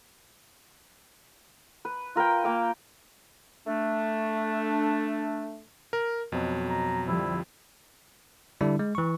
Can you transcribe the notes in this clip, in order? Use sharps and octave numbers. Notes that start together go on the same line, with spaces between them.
B4
F4 A#4 B4 G5
A#3 F5 G5
A3 D4
A#4
F2 B2 F#3
A#5
D3 F3 G3 E4
D3 G3 D4 E4
G#3
E3 C#6